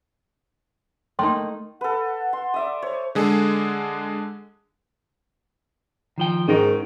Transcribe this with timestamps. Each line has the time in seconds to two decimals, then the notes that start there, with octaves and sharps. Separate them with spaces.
1.19 A3 A#3 D#4 G5 C6
1.81 A4 B4 F#5
2.33 C6
2.54 D5 E5 D#6
2.82 C5 C#5
3.15 D3 G#3 G#4 A4
6.18 D#3 F3 G5
6.48 G#2 D#3 C#4 D#4 A#4